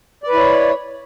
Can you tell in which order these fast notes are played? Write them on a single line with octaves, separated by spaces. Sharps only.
D5 B4 E4 C#5